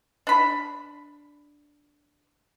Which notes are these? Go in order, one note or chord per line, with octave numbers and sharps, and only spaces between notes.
D4 B5